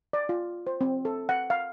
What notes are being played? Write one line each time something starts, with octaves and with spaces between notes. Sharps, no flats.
D5
F4
C5
C4
A4
F#5
F5